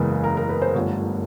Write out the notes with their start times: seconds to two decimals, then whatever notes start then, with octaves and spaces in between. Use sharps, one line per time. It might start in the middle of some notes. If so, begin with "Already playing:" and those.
Already playing: F#1 E2 C#3 E3 G#3
0.24 A#4
0.37 A#4
0.49 B4
0.62 C5
0.75 G1 G2 D3 F3 A3 C#5